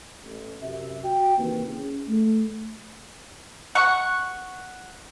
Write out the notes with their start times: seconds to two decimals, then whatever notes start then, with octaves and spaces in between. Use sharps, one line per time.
0.23 A1
0.61 F#2 C3 E5
1.03 F#4 G5
1.38 C3 D#3 E3 A#3 E4 B4
1.68 C#4 G#4
2.08 A3
3.75 F#5 C#6